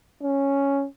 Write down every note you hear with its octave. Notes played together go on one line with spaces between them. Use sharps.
C#4